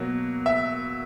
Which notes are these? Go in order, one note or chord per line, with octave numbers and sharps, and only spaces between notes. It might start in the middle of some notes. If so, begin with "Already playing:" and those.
Already playing: B2 F#3 A#3
E5